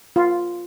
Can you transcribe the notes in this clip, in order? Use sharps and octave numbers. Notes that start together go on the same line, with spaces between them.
F4